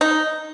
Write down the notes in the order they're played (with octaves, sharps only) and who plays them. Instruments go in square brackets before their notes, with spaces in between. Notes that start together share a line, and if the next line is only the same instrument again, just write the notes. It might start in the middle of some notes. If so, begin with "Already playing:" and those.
[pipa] D#4